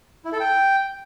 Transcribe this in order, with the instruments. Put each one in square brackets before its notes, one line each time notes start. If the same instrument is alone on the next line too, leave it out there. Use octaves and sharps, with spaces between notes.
[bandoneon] E4
A4
G5